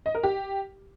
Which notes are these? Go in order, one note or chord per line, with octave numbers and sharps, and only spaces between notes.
D#5
A#4
G4